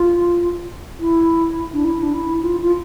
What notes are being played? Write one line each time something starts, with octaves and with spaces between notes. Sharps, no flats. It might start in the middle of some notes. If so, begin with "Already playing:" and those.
Already playing: F4
E4
D4
E4
D4
E4
F4
F4